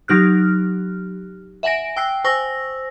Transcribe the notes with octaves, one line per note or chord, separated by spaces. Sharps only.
F#3 D#4 G4 F6 F#6
E5 F#5 G#5 A#6 D7
G5 E6 F#6 C7
C5 G#5 C#6 E6 A#6